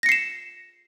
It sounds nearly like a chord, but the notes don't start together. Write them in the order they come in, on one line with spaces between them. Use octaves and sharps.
A#6 C#7 C7 E7